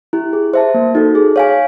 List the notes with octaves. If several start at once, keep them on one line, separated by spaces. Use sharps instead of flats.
E4 G4
G#4
C5 E5 A5
A#3
D#4 F#4 A4
G#4
C#5 F5 G#5